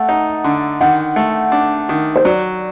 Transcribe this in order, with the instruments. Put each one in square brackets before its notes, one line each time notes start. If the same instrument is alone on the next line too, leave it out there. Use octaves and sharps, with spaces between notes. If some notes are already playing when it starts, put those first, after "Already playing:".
Already playing: [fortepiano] A3 [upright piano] F#5
[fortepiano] D#4
D3
[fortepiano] D#3 [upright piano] F#5
[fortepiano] A3
D4
D#3
[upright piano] C5
[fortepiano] F#3 [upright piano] D5